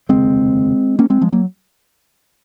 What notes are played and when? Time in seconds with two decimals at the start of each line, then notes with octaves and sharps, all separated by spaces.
0.09 F1 D#2 C#3 G#3 C4
0.99 A#3 C#4
1.10 G#3 C4
1.21 F3 G#3
1.32 F#3 A#3